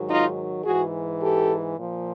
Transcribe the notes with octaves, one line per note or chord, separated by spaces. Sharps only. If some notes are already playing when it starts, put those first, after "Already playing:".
Already playing: G#2 D#3 F#3
D#4 F4
G#2 E3 F#4 G#4
G4 A4
A#2 F3